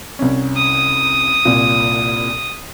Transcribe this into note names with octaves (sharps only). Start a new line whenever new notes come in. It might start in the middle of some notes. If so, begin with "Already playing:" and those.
C2 C#4
D#6
C2 A#2